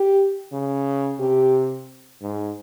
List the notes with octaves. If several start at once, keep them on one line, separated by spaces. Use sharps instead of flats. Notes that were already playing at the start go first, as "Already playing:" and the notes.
Already playing: G4
C#3
C3 G4
G#2